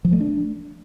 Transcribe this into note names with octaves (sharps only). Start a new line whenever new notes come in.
F3
A3
D4